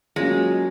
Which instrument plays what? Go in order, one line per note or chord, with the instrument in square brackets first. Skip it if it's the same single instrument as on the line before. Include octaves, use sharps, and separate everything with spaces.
[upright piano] F#3 A#3 C#4 F4 [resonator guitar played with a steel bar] G#3